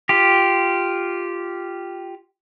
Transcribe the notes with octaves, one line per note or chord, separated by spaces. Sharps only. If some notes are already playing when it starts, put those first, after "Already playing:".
F4 G4